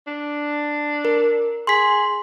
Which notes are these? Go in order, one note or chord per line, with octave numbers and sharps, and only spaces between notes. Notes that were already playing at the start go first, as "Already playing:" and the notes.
D4
A#4
G#4 C6 B6